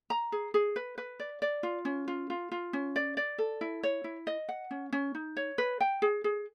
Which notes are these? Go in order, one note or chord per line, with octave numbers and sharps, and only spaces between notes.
A#5
G#4
G#4
B4
B4
D5
D5
F4
C#4
F4
F4
F4
C#4
D5
D5
A4
E4
C#5
E4
D#5
F#5
C#4
C#4
D#4
C#5
B4
G5
G#4
G#4